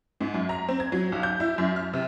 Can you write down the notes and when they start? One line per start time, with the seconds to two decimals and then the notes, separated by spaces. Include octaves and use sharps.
0.21 G#2
0.34 F#2
0.49 A#5
0.69 C4
0.80 G#6
0.92 F#3
1.12 B1
1.23 G6
1.40 E4
1.58 F#2
1.76 F6
1.93 C3